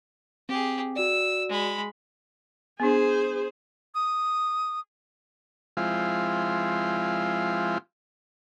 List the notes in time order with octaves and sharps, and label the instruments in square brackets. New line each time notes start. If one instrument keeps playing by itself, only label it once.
[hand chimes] C4 [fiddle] G4 G#4
[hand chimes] F#4 D5 [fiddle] E6
[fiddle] G#3 B5
[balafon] B3 D4 [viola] G#4 C5
[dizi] D#6
[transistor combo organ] F3 G#3 C4 E4 F4